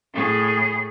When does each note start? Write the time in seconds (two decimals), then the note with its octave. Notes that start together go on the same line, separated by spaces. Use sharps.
0.14 A2 G#4